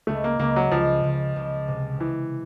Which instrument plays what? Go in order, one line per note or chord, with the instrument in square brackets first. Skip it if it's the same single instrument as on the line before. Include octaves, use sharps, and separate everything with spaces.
[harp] C#2 [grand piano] A3
[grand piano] A#3
[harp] C#2 [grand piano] A#3
[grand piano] F#3
[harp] C#2 [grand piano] F3
[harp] C#2
C#2
C3
[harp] C3 [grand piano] E3